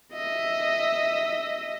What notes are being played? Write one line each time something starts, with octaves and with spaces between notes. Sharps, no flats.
D#5 E5